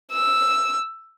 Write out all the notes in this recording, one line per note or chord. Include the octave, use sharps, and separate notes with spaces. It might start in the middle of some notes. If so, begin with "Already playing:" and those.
E6